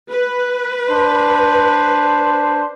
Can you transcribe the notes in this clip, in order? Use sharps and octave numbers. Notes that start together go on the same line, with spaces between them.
B4
D4 C5